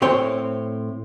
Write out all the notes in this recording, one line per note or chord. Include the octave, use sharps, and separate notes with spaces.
A2 C4 C#5 G5